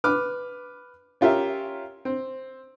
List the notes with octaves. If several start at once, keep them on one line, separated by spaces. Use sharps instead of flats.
B4 D6 F6
C#4 F4 G4 A#4 E5
C4